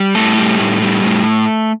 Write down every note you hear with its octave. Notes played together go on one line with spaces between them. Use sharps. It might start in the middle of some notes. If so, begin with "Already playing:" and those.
Already playing: G3
A2 A3 A4
G3
A2
G3
A2